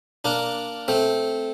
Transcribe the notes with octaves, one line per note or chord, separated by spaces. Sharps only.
A#3 D4
A3 C4